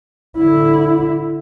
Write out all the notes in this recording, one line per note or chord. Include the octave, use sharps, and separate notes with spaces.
D3 E4